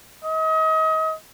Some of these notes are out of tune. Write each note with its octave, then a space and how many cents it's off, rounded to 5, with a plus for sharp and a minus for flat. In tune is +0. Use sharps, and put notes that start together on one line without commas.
D#5 +35